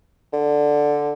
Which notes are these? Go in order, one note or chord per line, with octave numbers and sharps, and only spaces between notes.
D3